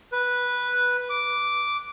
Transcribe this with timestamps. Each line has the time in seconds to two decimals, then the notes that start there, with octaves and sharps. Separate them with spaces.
0.12 B4
1.10 D6